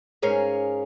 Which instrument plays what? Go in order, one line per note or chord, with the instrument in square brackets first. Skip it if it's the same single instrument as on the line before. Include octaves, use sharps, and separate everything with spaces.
[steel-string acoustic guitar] G#2 C#4 G#4 A#4 F5